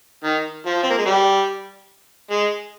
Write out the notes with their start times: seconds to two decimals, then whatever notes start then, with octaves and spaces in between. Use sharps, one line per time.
0.24 D#3
0.66 F3
0.83 C4
0.90 A#3
0.98 G#3
1.06 G3
2.31 G#3